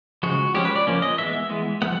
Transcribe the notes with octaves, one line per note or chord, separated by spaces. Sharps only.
C#3 F3 G#3 F#4
F3 G#3 C#4 G4
B4
D5
F3 A#3 C#4
D#5
E3 G#3 B3 E5
E3 G#3 B3
F3 G#3 B3 F#5